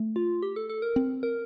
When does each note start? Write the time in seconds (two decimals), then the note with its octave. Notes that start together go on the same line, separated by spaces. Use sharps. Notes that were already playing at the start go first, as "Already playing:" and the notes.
Already playing: A3
0.16 F4
0.43 G4
0.56 A4
0.70 A4
0.82 A#4
0.96 C4
1.23 A#4